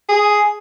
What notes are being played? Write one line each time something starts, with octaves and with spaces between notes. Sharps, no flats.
G#4